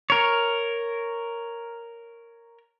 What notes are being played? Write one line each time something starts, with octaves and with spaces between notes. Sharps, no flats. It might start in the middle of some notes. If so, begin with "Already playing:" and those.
A#4 C#5